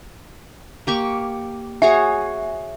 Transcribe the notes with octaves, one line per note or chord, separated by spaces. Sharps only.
A#3 G4 C#6
F#4 G#4 C#5 E5